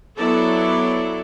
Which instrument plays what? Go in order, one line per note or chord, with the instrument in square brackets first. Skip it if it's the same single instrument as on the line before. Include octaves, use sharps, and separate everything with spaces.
[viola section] F#3 B3 E4 A4 D5